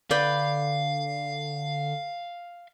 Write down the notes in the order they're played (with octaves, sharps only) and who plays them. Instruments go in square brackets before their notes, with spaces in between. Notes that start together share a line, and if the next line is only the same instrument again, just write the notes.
[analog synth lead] D3 [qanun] B4 D5 G5 [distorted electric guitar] F5